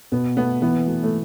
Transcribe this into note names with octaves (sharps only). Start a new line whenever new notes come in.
B2 B3
A3 B3 F#4
E3 B3
A3 F#4
A3